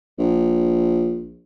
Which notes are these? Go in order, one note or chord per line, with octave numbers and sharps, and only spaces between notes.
A#1